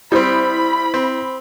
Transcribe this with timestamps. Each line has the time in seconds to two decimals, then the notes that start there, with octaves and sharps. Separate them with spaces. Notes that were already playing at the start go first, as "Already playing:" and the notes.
0.12 G3 C4 E4 C5 B5 D#6
0.94 C4